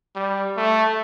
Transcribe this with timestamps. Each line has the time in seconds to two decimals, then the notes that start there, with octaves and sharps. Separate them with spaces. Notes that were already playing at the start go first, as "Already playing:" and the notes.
0.16 G3
0.57 A3